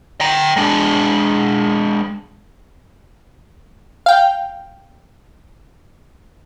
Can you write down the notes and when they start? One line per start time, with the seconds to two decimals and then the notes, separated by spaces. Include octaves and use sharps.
0.21 G5 A#5
0.57 G#3 D4
4.06 F5 G5